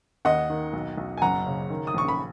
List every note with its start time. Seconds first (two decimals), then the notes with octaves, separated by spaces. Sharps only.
0.25 D#2 D#5 F#5
0.50 D#3
0.73 B1
0.97 B1
1.17 G#5
1.22 F#1 F#5 A#5
1.46 C#3
1.70 D#3
1.87 D#6
1.94 A#1 C#6
2.08 B5